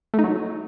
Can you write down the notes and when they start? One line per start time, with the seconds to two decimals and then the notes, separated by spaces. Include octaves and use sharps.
0.14 A3
0.19 D#4
0.24 F#3